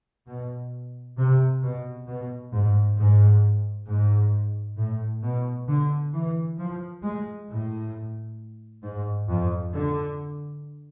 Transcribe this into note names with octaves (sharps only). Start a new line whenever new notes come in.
B2
C3
B2
B2
G#2
G#2
G#2
A2
B2
D3
E3
F3
G#3
A2
G#2
F2
D3